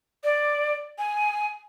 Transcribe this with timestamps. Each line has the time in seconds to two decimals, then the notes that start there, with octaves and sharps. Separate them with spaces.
0.24 D5
0.98 G#5